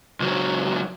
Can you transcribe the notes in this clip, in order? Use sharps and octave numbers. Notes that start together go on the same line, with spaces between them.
C#2 F#3